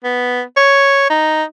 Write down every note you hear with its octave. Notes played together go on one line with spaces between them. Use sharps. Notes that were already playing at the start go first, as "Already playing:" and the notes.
B3
C#5
D#4